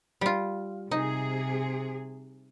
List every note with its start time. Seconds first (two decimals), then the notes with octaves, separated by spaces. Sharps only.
0.21 G3 F4
0.91 C3 D#4 G#4